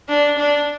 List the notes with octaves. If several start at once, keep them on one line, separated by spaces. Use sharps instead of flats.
D4
D4